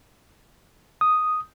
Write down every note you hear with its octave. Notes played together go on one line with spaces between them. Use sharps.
D#6